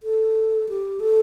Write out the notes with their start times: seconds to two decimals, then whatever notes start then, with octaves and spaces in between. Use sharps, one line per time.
0.03 A4
0.69 G4
1.00 A4